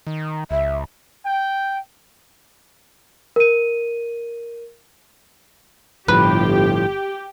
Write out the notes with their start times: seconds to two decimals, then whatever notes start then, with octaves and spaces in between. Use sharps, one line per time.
0.07 D#3
0.51 C#2 E5
1.26 G5
3.36 A#4 D#7
6.08 G1 A2 F3 G4 B4 G5